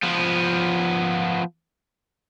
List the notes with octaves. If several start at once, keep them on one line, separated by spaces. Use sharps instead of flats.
F3 B3